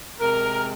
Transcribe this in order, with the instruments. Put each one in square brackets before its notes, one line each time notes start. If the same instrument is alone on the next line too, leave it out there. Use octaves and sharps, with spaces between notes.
[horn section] C3 G#3 A#4